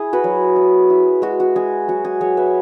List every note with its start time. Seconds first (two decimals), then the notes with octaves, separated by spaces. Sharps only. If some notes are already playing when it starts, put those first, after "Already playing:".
Already playing: E4 G#4
0.13 F#4 B4
0.24 F#3
0.56 E4
0.90 E4
1.22 G#3 F#4
1.40 F#4
1.56 G#3 G#4
1.88 F#3 F#4
2.04 G#4
2.21 F#3 G#4 C#5
2.37 B4 E5